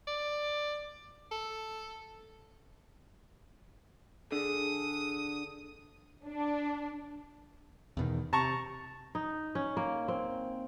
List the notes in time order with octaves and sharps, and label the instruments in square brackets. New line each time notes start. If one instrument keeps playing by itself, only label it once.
[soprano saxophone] D5
A4
[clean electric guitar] D3 [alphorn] G#4 [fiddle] D#6
[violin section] D4
[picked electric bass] E2 B2 D#3
[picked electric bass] C3 [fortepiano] A5 A#5 C#6
[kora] D#4
C#4
A#3
C4